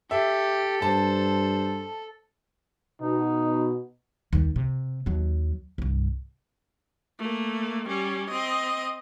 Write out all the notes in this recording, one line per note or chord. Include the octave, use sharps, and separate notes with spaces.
G4 A4 E5
G2 C5 A5
B2 D#4
D#2 G3
C3
D#2 F#3
C2 G2
A3 A#3
G3 C#4
C4 D#5